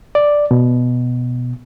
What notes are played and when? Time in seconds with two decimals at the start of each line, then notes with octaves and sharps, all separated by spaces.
0.15 D5
0.51 B2